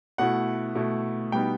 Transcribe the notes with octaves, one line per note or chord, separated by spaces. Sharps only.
B2 A3 E4 F#5
B2 A3 E4
B2 G3 B3 D#4 G5